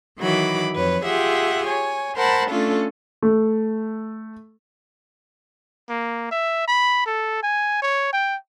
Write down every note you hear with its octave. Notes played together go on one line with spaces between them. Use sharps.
D#3 E3 F#3 B5 D6
F2 B4 C#5
F4 G4 G#4 E5 F#5
C#5 G#5
A#4 C5 F#5 A5 B5
A3 C#4 D4 F4 A4
A3
A#3
E5
B5
A4
G#5
C#5
G5